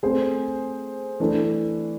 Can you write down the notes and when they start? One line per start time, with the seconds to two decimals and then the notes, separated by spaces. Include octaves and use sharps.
0.03 A3 C4 G#4 C5
1.20 E3 A3 D4